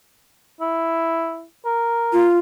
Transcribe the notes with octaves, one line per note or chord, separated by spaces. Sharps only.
E4
A#4
F4